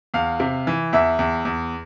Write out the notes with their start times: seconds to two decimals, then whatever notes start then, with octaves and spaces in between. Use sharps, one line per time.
0.14 E2 F5
0.40 C3
0.67 E3
0.93 E2 E5
1.19 E2
1.45 E2